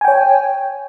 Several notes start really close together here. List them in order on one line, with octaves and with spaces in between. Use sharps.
G#5 G5 C#5